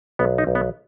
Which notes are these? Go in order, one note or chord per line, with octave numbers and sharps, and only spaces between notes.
B1 B3
D#4
B1
B3